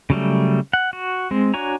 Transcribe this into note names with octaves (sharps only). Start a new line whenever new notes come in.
C#3 F#3 G3 A3
F#5
F#4
G#3 C4
D4 F#4 C#5 G#5 A#5